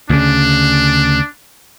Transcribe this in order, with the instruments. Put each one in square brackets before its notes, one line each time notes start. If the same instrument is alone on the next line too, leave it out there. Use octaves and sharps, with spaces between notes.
[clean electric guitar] D2 C#3 [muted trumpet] D4